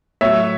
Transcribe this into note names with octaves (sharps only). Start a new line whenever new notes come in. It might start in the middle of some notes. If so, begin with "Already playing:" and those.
A2 F#3 C#5 E5